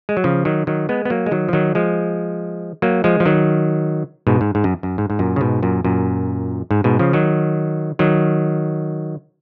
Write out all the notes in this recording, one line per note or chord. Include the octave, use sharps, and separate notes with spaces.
G#3
F#3
C#3 F3
D#3 F#3
D#3 F#3
G#3 B3
B3
F#3 A#3
G#3
D#3 F#3
F3
D#3 F#3
F3 G#3
F#3 A#3
F3 G#3
F3
D#3 F#3
G#2 B2
G#2
G#2
F#2
F#2
G#2
G#2
F#2 A#2
C#3
G#2 B2
F#2 A#2
F#2 A#2
G#2
G#2 B2
C#3 F3
D#3 F#3
D#3 F#3